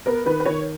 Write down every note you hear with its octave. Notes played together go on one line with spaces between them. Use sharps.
B3 A#4
D#3 B4
B4
D#3 C#5